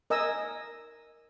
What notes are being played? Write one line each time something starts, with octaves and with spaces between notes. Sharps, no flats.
A#4 D#5 G#5 E6